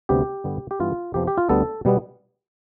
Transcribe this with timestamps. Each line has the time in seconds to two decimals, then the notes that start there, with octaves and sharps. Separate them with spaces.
0.09 D2 C3 G3 B3 G4
0.44 G2 D3 G3 B3
0.71 G4
0.80 G2 E3 B3 F4
1.14 F2 C3 F3 B3 G4
1.28 G4
1.38 F4
1.49 D2 D3 G3 B3 A4
1.85 B2 G3 B3